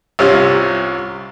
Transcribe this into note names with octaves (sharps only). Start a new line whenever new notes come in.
C2 C3 C#4 F4